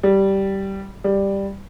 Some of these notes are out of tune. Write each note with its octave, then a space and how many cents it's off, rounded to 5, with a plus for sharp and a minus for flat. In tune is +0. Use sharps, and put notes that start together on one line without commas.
G3 -10
G3 +5